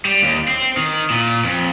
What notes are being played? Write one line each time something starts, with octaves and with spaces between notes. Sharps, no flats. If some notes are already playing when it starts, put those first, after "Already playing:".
G3
D#2
C4
D#3
A#2
F2